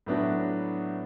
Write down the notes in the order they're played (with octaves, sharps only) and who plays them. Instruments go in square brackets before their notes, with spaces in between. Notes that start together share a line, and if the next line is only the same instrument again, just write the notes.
[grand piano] A2 F#3 B3 D4 F#4